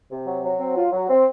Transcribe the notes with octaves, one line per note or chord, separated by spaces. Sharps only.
C3
F#3
F#3
C4
F4
F#3
C4